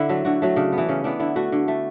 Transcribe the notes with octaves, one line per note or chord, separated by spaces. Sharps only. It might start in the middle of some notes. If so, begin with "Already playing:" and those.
Already playing: D3 E4
F#3 A3
D3 F#4
F#3 A3
C#3 D4
B3
E3
C#3 C#4
E3 B3 D4
D3 E4
A3 F#4
D3
A3